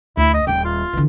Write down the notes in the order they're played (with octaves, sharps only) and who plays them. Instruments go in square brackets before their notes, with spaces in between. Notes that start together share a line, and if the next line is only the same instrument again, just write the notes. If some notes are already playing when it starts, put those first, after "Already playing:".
[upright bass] D2 [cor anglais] E4
[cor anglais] D#5
[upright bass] D#1 G3 [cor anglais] G5
[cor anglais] F4
[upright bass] D3 E3